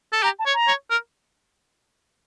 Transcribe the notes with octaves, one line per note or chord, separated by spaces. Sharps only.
A4
G4 A#5
A5
C#5
A#5
C#5
A#4